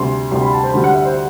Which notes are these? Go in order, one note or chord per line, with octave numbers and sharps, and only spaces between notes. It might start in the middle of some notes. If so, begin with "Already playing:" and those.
Already playing: D2 C3 G3 C6
D2 C3 G3 C6
B5
A5
C5
D2 D3 G3 C5
F#5
E5
C5